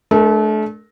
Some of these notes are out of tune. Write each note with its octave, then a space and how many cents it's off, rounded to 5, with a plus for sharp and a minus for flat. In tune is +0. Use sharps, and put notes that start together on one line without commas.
A3 -35 D4 +0 A#4 +0